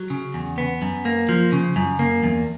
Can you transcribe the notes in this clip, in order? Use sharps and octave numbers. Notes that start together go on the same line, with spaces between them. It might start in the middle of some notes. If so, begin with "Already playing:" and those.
Already playing: F#3
C#3
E2
B3
F#2
A#3
F3
C#3
F#2
A#3
E2